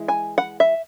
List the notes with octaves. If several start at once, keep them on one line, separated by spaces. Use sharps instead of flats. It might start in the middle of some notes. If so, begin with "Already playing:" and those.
Already playing: E3 G#3 E4
G#5
F#5
E5